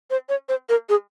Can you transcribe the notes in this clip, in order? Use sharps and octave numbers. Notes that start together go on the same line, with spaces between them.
C5
C#5
C5
A#4
G#4